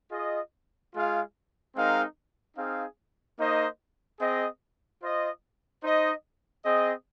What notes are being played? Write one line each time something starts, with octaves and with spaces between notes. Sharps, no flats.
F4 G#4 D#5
G#3 F4 G#4 F5
G#3 C4 D#4 A#4 F5
C4 D#4 G#4 F5
A#3 D#4 C5 D#5
C4 G#4 D#5
F4 C5 D#5
D#4 C5 D#5
C4 G#4 D#5